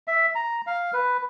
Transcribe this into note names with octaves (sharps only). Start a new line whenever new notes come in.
E5
A#5
F5
B4